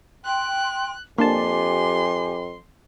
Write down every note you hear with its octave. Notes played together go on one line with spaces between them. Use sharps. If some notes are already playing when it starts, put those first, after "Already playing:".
G5 C6 F#6
F2 A#3 D4 G4 G#5 A5 C6